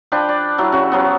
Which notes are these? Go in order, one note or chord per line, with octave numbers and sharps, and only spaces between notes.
F3 D4 B4 G5
D5
F#3 E4
C#3 F#4
F3 F#3 B3